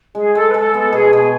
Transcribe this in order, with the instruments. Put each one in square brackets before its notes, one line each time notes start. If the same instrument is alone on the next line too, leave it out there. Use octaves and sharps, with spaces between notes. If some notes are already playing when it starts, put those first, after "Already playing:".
[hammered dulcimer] G#3 [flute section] G#4
[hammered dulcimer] G#3 [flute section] A4
[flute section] B4
[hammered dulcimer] G#3 [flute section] A4
[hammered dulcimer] B3 [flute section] A4
[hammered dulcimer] B2 [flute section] G#4
[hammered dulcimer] B2 [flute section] G#4